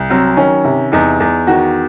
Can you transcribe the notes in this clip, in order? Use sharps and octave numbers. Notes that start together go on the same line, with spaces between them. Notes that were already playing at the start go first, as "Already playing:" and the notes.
Already playing: C2
F#3 C4
D#3 C#4
C3
E2 D#4
E2
D#3 F#4